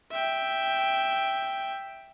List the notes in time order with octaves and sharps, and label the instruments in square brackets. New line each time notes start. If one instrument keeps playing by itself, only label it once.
[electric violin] E5 G5